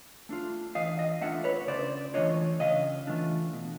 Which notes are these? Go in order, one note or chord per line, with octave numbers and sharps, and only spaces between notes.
A3 D4 F4
E3 D#5 F5
D#5 F5
A3 D4 F4 E5 F#5
B4 C#5
C#3 C5 D5
E3 A3 D4 F4 C#5 D#5
C#3 D#5 F5
E3 A3 D4 F4
B2